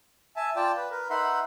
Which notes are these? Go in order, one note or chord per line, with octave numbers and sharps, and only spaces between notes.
E5 G#5 A5
F4 D5 G5 A5
B4
A#4 B4
D#4 B4 E5 F#5 B5 C6